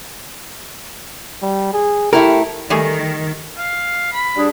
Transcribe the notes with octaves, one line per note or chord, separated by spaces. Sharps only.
G3
G#4
A3 E4 G4 A#4
D#3 G3 A3 G#4
F5
B5
G3 D4 G#4